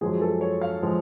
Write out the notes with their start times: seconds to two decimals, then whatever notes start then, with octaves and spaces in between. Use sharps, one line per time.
0.01 F#2 F3 G#3 G#4
0.21 A4
0.41 C#5
0.61 F5
0.83 F3 G#3